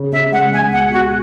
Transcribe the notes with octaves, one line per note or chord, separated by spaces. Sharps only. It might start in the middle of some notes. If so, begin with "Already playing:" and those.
Already playing: C#3
C#3 E5
G#3 F#5
C#2 G#5
B2 F#5
B2 F#4